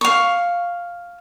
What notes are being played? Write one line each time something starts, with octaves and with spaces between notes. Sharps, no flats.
F5 C#6